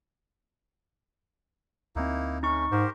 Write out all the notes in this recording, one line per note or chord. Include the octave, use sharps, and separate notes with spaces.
D2 A#3 C4 D#4 E4
A3 C#4 D#4 C#6
G#2 G4 A#4 C5